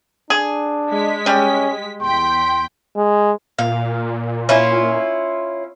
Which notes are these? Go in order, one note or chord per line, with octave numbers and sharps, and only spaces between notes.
D4 G#4
G#3 B6
G3 C#4 D#5
E2 G5 C6 B6
G#3
A#2 F5
C#4 E4 F4